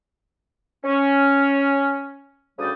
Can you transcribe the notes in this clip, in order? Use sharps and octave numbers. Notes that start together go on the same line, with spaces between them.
C#4
D2 C#3 G3 D5 G5 D#6